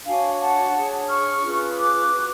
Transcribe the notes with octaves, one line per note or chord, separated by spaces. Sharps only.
D4 F#4 C#5 F5 G#5
F#5 A5
D4 G#4 C#5
C#6 F6
C#4 F4 G#4 B4
D6 F#6
F#4 B4